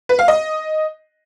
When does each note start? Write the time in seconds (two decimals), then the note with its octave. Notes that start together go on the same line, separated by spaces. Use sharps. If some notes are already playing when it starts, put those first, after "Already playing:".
0.09 B4
0.19 F5
0.28 D#5